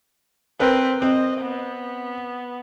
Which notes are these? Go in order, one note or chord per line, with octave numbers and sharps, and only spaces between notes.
C4 A#4 B4
C4 D#5
B3